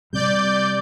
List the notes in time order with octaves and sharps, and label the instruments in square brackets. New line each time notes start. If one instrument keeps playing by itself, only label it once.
[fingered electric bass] C3 G3 [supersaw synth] D5 G6